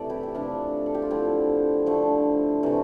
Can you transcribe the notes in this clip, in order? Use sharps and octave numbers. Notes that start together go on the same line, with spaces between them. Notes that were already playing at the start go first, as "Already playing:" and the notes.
Already playing: C3 E3 A3 A4 D5
E4 G4
G4
C3 E3 A3 D4 F4
A4
G4
F4
D3 F3 A3 C4 E4
D3 F3 A3
C3 E3 A3